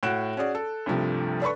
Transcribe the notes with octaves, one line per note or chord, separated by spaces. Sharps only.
A2 F#4 F#6 D7 E7
C#4 F#4 G#4 D5
A4
C2 G2 C3 F3 A3
D4 A4 B4 B5 C#6